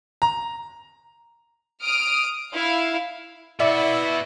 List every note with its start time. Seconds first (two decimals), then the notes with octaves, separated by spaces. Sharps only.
0.22 A#5
1.81 D#6 F6 D7
2.54 E4 F5
3.60 B3 E4 F#4 D5 E5